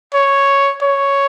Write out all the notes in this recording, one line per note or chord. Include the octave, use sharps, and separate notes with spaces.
C#5
C#5